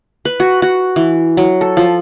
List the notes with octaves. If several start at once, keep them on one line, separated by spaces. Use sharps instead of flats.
B4
F#4
F#4
E3
F#3
A4
F3